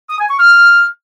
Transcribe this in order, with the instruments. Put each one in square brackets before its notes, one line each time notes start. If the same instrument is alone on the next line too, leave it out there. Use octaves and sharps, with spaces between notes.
[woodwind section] D#6
G#5
C#6
F6